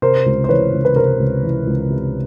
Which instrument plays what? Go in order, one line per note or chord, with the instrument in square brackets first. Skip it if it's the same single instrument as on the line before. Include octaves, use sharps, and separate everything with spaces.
[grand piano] C3 A#4 C5
C#2
C5
E3 B4 C#5
C#2
B4
C3 A#4 C5
C#2
E3
C#2
C3